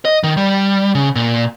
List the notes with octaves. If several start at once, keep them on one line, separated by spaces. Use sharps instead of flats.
D#5
D#3
G3
C#3
A#2